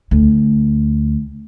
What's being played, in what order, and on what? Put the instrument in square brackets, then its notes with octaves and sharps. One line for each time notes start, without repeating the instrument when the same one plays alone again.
[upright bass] D2